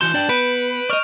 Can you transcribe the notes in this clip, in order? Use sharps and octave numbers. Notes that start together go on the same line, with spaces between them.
E3 F#4 C6 G6 E7
D4 D5 G5
B3 B4 D7
D5 D#5 C#6 F6 F7